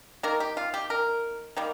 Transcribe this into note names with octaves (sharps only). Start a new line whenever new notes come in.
D#3 A#3 A#4
G4
F4
G4
A#4
D#3 G3 A#3